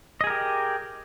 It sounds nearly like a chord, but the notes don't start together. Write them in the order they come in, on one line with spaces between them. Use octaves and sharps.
D#5 G#4 A#4 G4